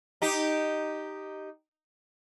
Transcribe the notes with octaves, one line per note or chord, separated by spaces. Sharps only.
D#4 G4